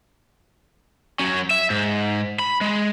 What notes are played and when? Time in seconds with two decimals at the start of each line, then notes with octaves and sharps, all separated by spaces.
1.19 F#3 C#4
1.51 E5
1.70 G#2
2.39 B5
2.61 G#3